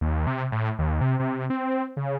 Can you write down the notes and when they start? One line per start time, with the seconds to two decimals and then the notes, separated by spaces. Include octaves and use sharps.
0.01 D#2
0.27 C3
0.52 A2
0.79 D#2
1.01 C3
1.19 C3
1.50 C4
1.97 C#3